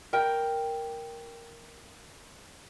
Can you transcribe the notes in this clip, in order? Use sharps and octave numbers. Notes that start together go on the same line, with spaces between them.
A#4 G5